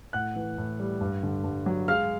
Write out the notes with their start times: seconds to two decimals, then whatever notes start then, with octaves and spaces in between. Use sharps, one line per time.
0.13 A2 F#5 F#6
0.36 E3
0.58 A2
0.80 G3
1.01 G2
1.23 D3
1.44 G2
1.66 F#3
1.88 G#3 F5 F6